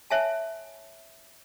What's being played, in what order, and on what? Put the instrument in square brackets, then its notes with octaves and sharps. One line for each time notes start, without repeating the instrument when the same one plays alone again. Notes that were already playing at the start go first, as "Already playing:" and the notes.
[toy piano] C#5 E5 G#5 A5